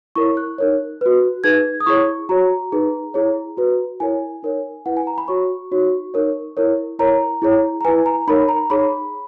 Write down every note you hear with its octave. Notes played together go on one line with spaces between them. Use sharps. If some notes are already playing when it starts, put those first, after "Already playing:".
E4 A#4 C#5 C#6
F#6
D#4 A#4 C#5
F#4 B4
D#4 G#4 B4 G#6
D#6
E4 G#4 C#5 C#6
F#4 C#5 A#5
D#4 G#4 B4
E4 G#4 C#5
F#4 B4
E4 A#4 C#5 G#5
D#4 A#4 C#5
E4 B4 F#5
G#5
A#5
B5
F#4 C#5 C#6
D#4 F#4 C#5
D#4 A#4 C#5
E4 A#4 C#5
E4 A#4 C#5 A#5
E4 G#4 C#5
A#5
E4 B4 G#5
A#5
D#4 A#4 C#5 B5
A#5
D#4 G#4 C#5 B5